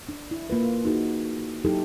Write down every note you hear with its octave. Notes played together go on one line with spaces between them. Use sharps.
D4
E4
A#3 F4 B4
D#4 F#4 G#4
F#3 D#4 E4 G4 A4